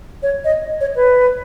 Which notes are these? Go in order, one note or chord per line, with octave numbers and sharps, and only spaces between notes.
C#5
D#5
C#5
B4